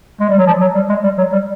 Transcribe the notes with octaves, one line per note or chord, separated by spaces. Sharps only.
G#3
G3
F#3
F3
F#3
G3
G#3
G3
F#3
G3